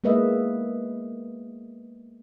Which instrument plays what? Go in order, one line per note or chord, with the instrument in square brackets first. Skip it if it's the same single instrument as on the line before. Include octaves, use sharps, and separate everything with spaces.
[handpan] G#3 A#3 B3 B4 D#5 E5